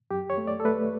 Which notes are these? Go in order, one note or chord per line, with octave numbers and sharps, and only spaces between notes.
F#2 G4
C#5
A3
D5
A4
A3 B4